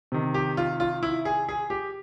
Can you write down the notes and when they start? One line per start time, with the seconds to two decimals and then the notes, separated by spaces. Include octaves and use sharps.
0.12 C3 D#3
0.34 G4
0.57 F4
0.80 F4
1.03 E4
1.25 G#4
1.49 G#4
1.70 G4